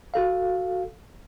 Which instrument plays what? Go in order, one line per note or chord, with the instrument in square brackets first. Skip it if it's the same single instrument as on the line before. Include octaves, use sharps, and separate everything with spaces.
[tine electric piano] F#4 A4 F5